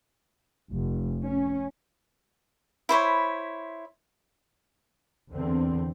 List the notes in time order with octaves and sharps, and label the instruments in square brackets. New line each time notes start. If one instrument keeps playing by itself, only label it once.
[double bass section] F1
C#4
[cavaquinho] E4 C5 C#5 B5
[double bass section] E2 D3 C4